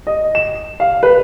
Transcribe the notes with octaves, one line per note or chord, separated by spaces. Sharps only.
D#5
E7
F5
B4